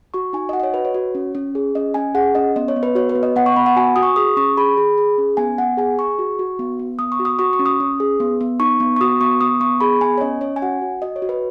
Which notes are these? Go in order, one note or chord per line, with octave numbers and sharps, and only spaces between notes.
F#4 C#6
D#4 G#5
D#5
F#4 F#5
D#5
C#5
F#4 B4
C#5
F#4
C#4
C#4
G#4
C#4 D#5
C#4 G#5
G#4 F#5
C#4 D#5
B3 D#5
C#5
B3
B4
F#4 C#5
B4
B3
D#5
B3 F#5
C#6
B3 B5
F#5
F#4 G#5
F#4 D#6
C#6
G#4 D#6
C#4 C#6
G#4 B5
G#4
G#4
C#4
B3 G#5
B3 F#5
G#4 G#5
G#4 C#6
F#4
F#4
B3
B3
B3 D#6
C#6
F#4
D#6
F#4 C#6
C#6
C#4
D#6
C#4
G#4
B3
B3
D#4 C#6
B3
C#6
F#4 D#6
B3 C#6
B3 D#6
B3 C#6
G#4 B5
B3 G#5
C#5
C#4 D#5
C#4 C#5
G#5
F#4 F#5
F#4
F#4 D#5
C#5
F#4
B4